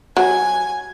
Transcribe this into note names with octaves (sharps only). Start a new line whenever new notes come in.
F#3 G#5